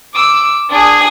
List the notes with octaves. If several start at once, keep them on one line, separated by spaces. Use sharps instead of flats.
D6 E6
D4 G#4